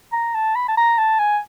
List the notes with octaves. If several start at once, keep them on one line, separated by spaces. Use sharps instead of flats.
A#5
A5
B5
A5
A#5
A5
G#5